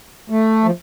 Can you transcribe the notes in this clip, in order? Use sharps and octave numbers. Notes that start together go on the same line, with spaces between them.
A3
F3